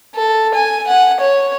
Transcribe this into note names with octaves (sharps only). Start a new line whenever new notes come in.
A4
G#5
F#5
C#5